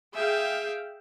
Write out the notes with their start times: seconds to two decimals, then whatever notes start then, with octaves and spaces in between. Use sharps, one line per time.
0.15 G#4 E5 F5 G5